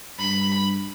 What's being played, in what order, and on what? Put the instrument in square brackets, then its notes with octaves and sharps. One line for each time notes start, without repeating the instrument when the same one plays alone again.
[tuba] G2 [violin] B5